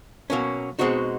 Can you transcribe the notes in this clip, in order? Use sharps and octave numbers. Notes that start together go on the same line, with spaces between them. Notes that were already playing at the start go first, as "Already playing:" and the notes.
B2 F#3 A#3 C#4
B2 G#3 C4 D#4 F#4